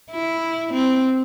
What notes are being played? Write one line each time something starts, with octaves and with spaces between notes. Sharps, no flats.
E4
C4